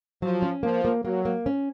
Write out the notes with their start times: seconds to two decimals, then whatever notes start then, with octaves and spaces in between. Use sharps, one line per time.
0.22 F3 F#3
0.42 C#4
0.63 F3 A#3
0.85 A#3
1.05 F#3 A#3
1.25 A#3
1.46 C#4